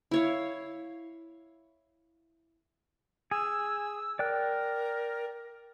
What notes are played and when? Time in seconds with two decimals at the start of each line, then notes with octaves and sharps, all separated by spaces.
0.11 E4 C#5 F5
3.31 G#4 E6
4.19 A#4 D5 G5 F#6